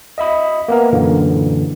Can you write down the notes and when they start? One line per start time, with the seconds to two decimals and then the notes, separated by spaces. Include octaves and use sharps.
0.18 D#5 E5 B5 D#6
0.68 A#3 B3 A#4
0.93 F#2 A#2 D3 E3